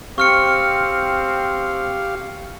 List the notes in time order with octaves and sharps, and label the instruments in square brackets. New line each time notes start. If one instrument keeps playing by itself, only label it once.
[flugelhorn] C4 [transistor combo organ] G4 F5 [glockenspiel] C#6 F6 C#7